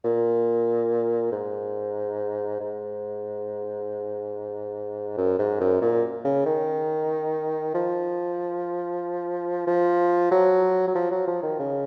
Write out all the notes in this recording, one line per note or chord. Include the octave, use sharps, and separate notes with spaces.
A#2
G#2
G#2
F#2
G#2
F#2
A#2
C#3
D#3
F3
F3
F#3
F#3
F3
F#3
F3
D#3
C#3